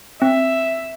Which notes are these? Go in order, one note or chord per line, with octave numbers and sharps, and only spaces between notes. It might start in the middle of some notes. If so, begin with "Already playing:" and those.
C4 E5